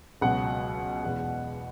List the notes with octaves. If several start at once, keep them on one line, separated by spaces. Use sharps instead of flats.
C#2 B2 F#3 F#5
E2 B2 G#3